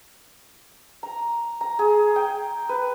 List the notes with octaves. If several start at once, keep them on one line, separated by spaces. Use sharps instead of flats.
A#5
A#5
G#4
G5
B4